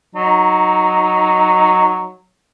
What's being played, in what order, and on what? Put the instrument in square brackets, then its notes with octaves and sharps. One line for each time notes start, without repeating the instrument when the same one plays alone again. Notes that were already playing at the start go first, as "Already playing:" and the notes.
[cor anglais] F#3 [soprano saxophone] D#4